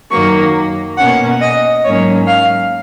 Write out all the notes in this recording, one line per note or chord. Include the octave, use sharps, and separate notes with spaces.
F#2 D#3 F#3 A#3 C#6
B2 A#3 C#4 F#5
D#5
G#2 F#3 A#3 C#4 C#5
F5